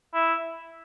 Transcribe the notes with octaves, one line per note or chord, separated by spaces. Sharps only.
E4